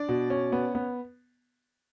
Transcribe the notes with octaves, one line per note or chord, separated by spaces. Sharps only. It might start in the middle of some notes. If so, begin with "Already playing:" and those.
Already playing: D4 D5
B2
C#4
B3
B3